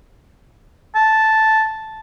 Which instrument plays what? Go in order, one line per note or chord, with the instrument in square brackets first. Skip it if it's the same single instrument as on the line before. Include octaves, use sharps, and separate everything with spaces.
[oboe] A5